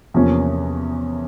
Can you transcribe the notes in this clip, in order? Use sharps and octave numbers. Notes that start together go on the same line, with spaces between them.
E2 C3 F3 A#3 C#4